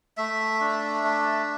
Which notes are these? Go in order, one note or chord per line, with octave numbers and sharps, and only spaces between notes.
A3 E5
D4
A3